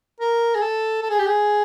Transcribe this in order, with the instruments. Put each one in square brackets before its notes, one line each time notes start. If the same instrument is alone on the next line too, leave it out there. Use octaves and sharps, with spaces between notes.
[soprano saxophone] A#4
G#4
A4
A4
G#4
G4
G#4